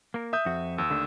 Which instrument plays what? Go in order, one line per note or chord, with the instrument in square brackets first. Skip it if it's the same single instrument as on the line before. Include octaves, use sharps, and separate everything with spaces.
[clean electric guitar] A#3 A#4
[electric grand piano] E5 D#6 G6
[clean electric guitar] F2 F#4
[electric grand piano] D#2 [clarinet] E6
[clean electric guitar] D3 A3 D4